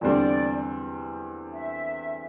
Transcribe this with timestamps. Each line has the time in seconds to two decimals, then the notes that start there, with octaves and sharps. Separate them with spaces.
0.01 E2 D3 G3 C4 D5
1.52 E5